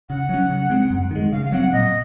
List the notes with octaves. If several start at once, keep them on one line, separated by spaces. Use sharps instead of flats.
C#3 F#5
F#3 C#4
C#3
G#3 C4
F#2
D#3 G#3
C#3 F5
F5
F#3 C4 F#5
A#2 D#5